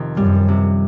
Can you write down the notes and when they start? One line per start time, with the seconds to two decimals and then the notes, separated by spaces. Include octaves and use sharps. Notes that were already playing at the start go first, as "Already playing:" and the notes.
Already playing: F2 C3 D#3
0.17 F#2 G3
0.48 C3